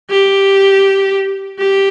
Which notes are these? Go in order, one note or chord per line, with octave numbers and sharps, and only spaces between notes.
G4
G4